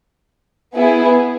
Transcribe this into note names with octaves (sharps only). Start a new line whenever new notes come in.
B3 E4 G#4